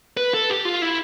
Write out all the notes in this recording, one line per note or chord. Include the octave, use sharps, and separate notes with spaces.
B4
A4
G4
F4
E4